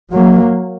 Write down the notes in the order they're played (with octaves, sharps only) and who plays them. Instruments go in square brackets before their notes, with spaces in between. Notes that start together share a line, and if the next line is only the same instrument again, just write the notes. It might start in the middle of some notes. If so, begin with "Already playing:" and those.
[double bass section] F#3 A#3